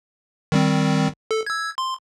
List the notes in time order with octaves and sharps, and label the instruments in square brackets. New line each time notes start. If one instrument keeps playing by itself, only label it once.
[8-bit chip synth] D#3 G3 C4
A4
E6 G#6
C6